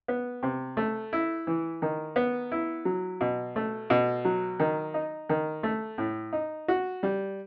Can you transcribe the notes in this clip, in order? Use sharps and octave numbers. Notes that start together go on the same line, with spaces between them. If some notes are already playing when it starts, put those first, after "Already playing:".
B3
C3
A3
E4
E3
D#3
B3
E4
F#3
B2
A3
B2
F#3
D#3
D#4
D#3
A3
A2
D#4
F#4
G3